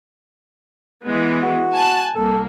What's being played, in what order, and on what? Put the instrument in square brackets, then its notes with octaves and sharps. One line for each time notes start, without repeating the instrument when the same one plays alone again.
[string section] E3 G#3 B3
[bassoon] F#4
[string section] G#5 A5 F#6
[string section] C2 A#3 [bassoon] A4